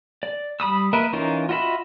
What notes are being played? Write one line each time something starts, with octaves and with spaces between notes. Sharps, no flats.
D5
G3 B5 D#6 E6
A#3 A#4 B4 D#5 E5
E3 C#4 D#4 F4 A#4
F4 F#4 D#5 E5 B5